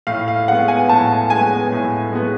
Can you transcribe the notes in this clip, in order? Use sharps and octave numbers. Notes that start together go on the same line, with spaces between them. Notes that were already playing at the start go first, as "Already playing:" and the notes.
A2 F5
F5
G#3 B3 F#5
G#5
A2 A5
G#3 B3 G#5
A2
G#3 B3